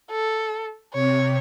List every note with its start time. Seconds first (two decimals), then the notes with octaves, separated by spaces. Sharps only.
0.11 A4
0.94 C3 C#5